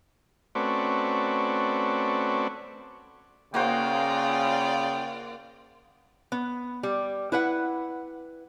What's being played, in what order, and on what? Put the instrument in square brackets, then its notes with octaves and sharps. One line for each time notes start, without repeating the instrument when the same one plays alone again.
[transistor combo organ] A3 C4 C#4 F#4 B4 D5
[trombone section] C#3 [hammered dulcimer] A#3 F#4 C5 [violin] F4 D5 [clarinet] G5
[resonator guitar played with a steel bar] B3
G3
E4 B4 F#5